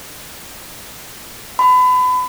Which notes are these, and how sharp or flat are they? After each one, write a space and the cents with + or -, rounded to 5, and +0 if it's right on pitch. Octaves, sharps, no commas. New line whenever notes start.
B5 +30